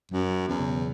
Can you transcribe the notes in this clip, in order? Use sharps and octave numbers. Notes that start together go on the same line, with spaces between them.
F#2 F#3
F#3
E2 E3
C#3
B2